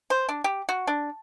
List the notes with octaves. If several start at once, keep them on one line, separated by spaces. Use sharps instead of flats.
C5
D4
G4
F#4
D4